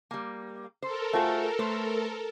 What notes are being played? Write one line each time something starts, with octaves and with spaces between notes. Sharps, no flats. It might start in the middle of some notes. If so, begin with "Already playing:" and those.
G3 A#3
A4 A#4 C5
A3 F4 F#4 G#4 C5 E5
A3 B4 C5